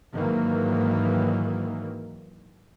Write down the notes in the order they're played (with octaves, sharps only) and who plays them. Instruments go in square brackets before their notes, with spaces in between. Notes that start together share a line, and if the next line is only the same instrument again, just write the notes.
[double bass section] G#2 D#3 E3 F#3 A#3